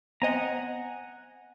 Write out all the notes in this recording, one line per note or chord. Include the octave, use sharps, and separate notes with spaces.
B3 C4 D#5 F#5 G#5 A#5